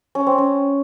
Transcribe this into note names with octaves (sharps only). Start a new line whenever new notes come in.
C#4
C4
C#4